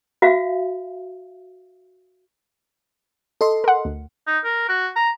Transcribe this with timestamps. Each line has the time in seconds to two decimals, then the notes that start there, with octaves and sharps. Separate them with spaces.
0.22 F#4 E5 F5
3.41 A4 D#5 C6
3.64 A#4 F#5
3.85 D2
4.27 D#4
4.44 A#4
4.69 F#4
4.96 A#5